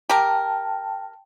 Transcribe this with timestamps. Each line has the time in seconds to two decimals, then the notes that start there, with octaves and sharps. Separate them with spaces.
0.10 G4 A#4 G5 A5